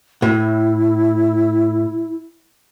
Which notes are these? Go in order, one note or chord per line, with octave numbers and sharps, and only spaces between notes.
A2 E4